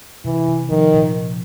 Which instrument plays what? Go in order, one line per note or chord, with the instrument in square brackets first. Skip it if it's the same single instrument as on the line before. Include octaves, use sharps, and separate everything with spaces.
[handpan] C3 [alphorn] E3
[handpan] C3
[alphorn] D#3 [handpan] F3
[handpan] A#2
F3